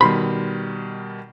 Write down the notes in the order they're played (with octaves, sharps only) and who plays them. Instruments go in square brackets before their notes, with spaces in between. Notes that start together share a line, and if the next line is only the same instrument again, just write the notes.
[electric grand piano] B2 D#3 G3 [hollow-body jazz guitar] B5 C6